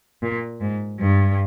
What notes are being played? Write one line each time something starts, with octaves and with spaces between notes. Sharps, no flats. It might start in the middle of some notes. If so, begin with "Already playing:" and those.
A#2
G#2
G2